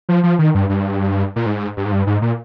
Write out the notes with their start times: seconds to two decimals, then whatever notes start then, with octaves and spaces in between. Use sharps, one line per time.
0.09 F3
0.23 F3
0.39 D#3
0.55 G2
0.69 G2
1.36 A#2
1.46 G#2
1.77 G2
1.86 G#2
1.92 G2
2.07 G#2
2.22 A#2